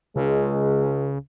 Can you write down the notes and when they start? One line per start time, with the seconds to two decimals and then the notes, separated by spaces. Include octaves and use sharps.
0.16 C#2 C#3 G#3